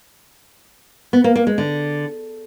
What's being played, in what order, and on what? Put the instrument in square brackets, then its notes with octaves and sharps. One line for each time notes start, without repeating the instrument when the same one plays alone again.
[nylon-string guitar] B3
A#3
A#3
G#3
D3